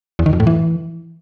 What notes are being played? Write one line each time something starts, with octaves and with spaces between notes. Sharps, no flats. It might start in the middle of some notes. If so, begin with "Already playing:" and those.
E2
D#3
F2
A2
E3